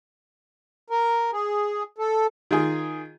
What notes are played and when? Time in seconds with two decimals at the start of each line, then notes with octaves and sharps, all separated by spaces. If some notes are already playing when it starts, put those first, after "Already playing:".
0.90 A#4
1.32 G#4
1.98 A4
2.51 D#3 F4 G#4